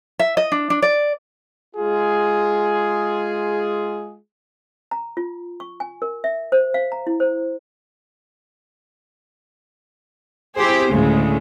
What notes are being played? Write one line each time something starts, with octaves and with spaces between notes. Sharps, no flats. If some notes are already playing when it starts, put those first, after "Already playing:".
E5
D#5
D4
D4
D5
G#3 F4 G#4
A#5
F4
C#6
G#5
A#4
E5
C5
F5
A#5
E4
C5
C4 E4 G4 G#4 C5
D2 A2 C#3 G#3